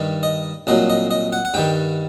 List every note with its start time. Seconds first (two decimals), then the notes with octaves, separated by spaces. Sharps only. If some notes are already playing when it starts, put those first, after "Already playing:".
Already playing: G2 D#3 G3
0.23 D#5
0.67 C2 A#2 F#3 D#5
0.90 D#5
1.11 D#5
1.33 F#5
1.45 F#5
1.54 G2 D#3 G3 G5